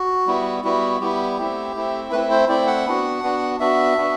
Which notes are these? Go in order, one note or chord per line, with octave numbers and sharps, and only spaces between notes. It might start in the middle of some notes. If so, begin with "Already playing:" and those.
Already playing: F#4
G3 B3 E4
G3 B3 E4 F#4
G3 B3 E4 G4
A3 C4 E4
A3 C4 E4
A3 C4 E4 B4
C5
A3 C4 E4 D5
F#5
B3 D4 F#4
B3 D4 F#4
B3 D4 F#4 E5
B3 D4 F#4